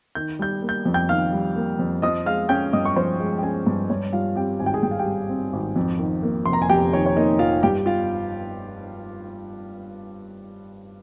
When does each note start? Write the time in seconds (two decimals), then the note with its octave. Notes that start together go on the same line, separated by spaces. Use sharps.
0.15 D#3 G6
0.39 G3 G6
0.62 A#3
0.69 G6
0.85 F2
0.94 G5 G6
1.09 D#3 F5 F6
1.33 G3
1.56 A#3
1.79 F2
2.02 F3 D#5 D#6
2.26 G#3 F5 F6
2.49 C#4 G5 G6
2.73 G2 D#5 D#6
2.85 C#6
2.96 F3 C5 C6
3.20 G#3
3.38 G5
3.43 C#4 G#4 G#5
3.67 G2
3.90 G2 C#5
4.12 G3 F4 F5
4.36 C4 G4 G5
4.59 G#1 G#5
4.66 G5
4.74 G#4 G#5
4.83 G2 G5
4.91 F5
4.99 G4 G5
5.06 G3
5.29 C4
5.53 G#1
5.76 F2
5.99 D#3
6.23 A#3
6.46 F1 C6
6.53 A#5
6.62 G#5
6.69 F2 G4 G5
6.93 D#3 C#5
7.06 C#5
7.16 A#3 D#4 D#5
7.39 F1 F4 F5
7.63 G2 G4 G5
7.86 G3 F4 F5